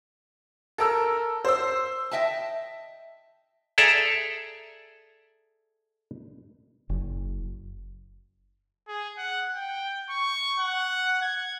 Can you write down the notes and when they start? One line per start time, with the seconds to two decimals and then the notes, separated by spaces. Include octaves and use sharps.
0.78 A4 A#4 E6
1.45 C5 E6
2.11 D#5 E5 G5 A5
3.78 G#4 A4 D5 E5 A#5
6.89 F#1
8.88 G#4
9.18 F#5
9.55 G5
10.10 C#6
10.59 F#5
11.22 G#6